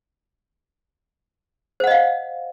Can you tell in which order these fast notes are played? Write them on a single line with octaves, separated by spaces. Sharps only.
C5 F#5 D#5 F5